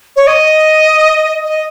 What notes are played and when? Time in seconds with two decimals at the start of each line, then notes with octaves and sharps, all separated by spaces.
0.16 C#5
0.27 D#5
1.44 D#5